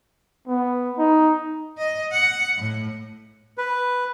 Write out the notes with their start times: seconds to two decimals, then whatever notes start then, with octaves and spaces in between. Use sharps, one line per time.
0.47 B3
0.98 D#4
1.78 D#5
2.12 F#5
2.57 A2
3.58 B4